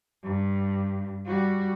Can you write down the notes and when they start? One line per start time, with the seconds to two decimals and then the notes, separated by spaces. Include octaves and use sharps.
0.23 G2
1.26 G3 F#4